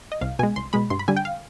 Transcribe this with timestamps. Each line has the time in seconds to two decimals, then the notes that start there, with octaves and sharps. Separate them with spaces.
0.12 D#5
0.21 C2 F5
0.39 B2 G#3 G#5
0.56 C2 C6
0.73 B2 G#3 B5
0.90 G2 C6
0.99 B5
1.08 D3 G3 G#5
1.16 G5
1.25 F5